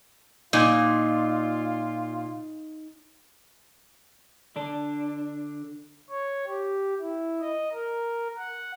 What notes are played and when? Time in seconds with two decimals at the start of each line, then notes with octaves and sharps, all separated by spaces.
0.53 A#2 D#4 F4
4.56 D3 D4
6.10 C#5
6.47 G4
7.00 E4
7.41 D#5
7.72 A#4
8.37 F#5